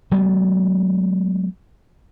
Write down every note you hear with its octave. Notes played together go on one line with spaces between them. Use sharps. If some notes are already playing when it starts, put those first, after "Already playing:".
F#3 G#3 A3 B3